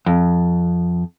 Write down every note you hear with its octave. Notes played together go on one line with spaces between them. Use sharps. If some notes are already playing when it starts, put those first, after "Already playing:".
F2